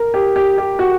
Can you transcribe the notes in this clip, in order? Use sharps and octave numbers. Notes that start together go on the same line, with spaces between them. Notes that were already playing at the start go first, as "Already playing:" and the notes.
Already playing: A#4
G4
G4
G4
F#4